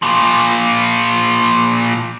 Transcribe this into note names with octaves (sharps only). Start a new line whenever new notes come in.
A#2 F3